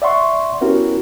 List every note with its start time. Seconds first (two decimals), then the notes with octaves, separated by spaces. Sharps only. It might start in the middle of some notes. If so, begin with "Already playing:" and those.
0.02 D5 E5 F#5 C6 C#6
0.61 B3 C#4 E4 F#4 G4 A#4